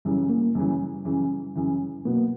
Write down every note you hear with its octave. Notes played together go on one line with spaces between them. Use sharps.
F#2 C#3 E3 G3
A#3
F#2 C#3 E3 G3
F#2 C#3 E3
F#2 C#3 E3
B2 F#3 A#3 B3